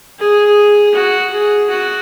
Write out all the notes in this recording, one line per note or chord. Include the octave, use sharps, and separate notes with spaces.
G#4
F#4
G#4
F#4